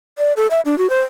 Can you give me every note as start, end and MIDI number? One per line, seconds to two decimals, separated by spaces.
0.18 0.33 74
0.37 0.47 69
0.50 0.60 76
0.65 0.77 62
0.78 0.89 66
0.90 1.01 72